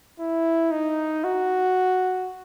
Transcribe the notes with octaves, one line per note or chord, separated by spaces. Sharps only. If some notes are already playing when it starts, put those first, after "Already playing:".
E4
D#4
F#4